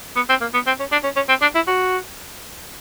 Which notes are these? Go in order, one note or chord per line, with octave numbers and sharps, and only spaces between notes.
B3
C4
A#3
B3
C4
C#4
D4
C#4
C#4
C4
D4
E4
F#4